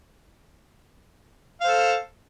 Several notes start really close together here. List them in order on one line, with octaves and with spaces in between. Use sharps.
F5 C5 A4